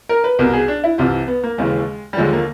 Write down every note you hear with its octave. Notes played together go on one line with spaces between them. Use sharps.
A#4
B4
C2 B2 A#4
G#4
D4
E4
C2 C3 E3 F4
B3
A#3
D#2 C#3 E3 G#3
G3
D#2 D3 F3 G#3
A#3